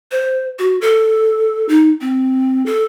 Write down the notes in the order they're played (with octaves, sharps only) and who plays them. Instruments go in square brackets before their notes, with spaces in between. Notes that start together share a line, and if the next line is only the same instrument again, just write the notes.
[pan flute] C5
F#4
A4
D#4
C4
A4